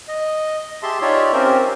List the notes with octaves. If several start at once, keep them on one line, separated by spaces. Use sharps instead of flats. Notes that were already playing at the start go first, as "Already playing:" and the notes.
D#5
G4 G#4 E5 A5 C6
D#4 F4 G4 C#5 D5 E5
C4 C#4 G4 A#4 C5